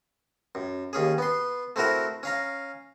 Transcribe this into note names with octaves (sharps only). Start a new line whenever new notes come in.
F#2
D#2 C#4 G#4
B3 C6
A3 C4 E4 F#4 A#4 A#5
C#4 F5 A#5